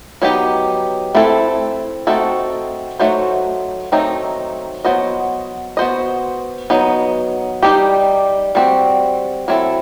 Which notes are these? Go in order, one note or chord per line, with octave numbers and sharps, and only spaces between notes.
F#3 B3 D#4 G4
A3 C4 E4 A4
A3 C4 D#4 F#4 A4
F#3 A3 D#4 F#4 C5
D#3 F#3 A3 C4 D#4
F#3 B3 F#4 C5 D#5
B3 F#4 C5 D#5
F#3 B3 D#4
G3 D#4 G4
G3 C4 F#4
F#3 C4 E4 A4